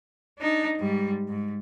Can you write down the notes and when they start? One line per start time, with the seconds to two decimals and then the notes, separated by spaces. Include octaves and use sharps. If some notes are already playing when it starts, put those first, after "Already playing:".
0.38 D4 D#4
0.78 G#2 G3
1.28 G#2